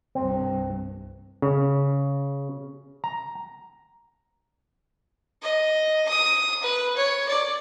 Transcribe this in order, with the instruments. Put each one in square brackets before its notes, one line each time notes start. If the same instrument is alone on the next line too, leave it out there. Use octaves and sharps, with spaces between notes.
[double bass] C2 G2 [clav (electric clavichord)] C4
[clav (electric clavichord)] C#3
A#5
[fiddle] D#5
D#6
B4
C#5
D5